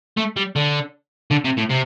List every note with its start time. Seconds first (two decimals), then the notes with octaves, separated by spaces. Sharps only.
0.17 A3
0.36 G3
0.56 D3
1.31 D3
1.44 C3
1.57 A2
1.69 C3